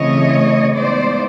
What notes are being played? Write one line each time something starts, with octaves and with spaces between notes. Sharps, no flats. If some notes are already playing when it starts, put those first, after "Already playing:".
Already playing: C#3 E3 A3 C4 C#5 D#5
E3 G#3 B3 D#4 C5 D5